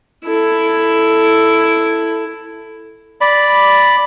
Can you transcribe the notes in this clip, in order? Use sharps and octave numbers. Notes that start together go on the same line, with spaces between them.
E4 A4
D5 B5